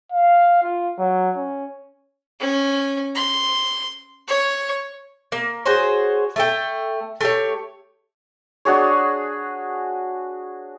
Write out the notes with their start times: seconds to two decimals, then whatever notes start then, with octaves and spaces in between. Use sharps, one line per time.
0.12 F5
0.63 F4
0.99 F#3
1.36 C#4
2.40 C#4
3.15 C6
4.28 C#5
5.32 A#3
5.66 F#4 G#4 C5 C#5
6.36 A3 A4 G5
7.21 A3 G4 C#5
8.65 D4 F#4 G#4 C#5